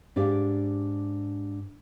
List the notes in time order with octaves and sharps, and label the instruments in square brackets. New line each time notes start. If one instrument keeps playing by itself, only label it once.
[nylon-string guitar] G#2 D4 G4 D5 F5